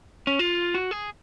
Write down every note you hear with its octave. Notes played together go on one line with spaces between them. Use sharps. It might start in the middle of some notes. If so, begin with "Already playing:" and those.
C#4
F4
F#4
G#4